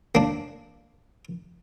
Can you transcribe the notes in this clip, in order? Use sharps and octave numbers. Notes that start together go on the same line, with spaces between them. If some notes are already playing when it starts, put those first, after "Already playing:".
A#3 D4